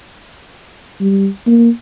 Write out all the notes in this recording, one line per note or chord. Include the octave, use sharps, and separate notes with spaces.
G3
A#3